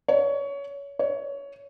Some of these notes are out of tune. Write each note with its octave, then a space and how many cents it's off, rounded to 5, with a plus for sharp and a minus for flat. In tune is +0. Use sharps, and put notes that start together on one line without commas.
C#5 +20
C#5 +15